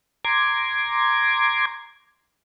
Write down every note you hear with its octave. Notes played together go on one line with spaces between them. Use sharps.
A#5 C6 D6 G#6